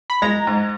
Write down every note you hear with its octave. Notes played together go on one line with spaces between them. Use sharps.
B5
G#3 A#5
G#2